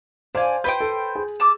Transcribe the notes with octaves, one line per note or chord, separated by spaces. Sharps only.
D4 C5 F5 G#5
B4 C5 G5 G6
A4
G#4
A5 D6 E6